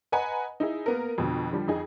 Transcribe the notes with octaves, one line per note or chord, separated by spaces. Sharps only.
B4 D#5 F#5 G#5 A#5 B5
D#4 E4 G#4
A#3 B3 A#4
F2 B2 D3
D3 F3 G3
F2 D#4 G#4